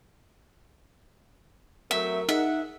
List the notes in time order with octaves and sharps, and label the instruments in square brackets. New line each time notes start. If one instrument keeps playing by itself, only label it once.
[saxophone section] F#3 A3 C4 [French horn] A#4 [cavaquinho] E5
[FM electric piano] D#4 G#4 [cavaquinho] E5 [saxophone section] F#5